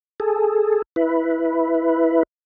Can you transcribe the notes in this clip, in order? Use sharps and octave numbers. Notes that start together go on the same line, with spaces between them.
G#4 A4
E4 B4